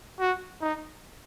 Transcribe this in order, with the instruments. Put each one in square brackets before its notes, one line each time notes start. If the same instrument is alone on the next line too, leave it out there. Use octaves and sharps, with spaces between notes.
[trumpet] F#4
D#4